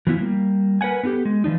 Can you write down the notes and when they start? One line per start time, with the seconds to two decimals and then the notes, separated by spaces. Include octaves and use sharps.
0.07 E3 F3 B3 E4 F4
0.19 G3 A#3
0.81 A#4 B4 C#5 F#5 G#5
1.03 B3 D#4 F4 G4 A4
1.25 G#3
1.44 E3 F3 D4 D#4